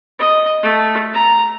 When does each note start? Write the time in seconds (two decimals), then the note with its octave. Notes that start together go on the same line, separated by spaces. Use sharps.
0.19 D#5
0.62 A3
1.13 A#5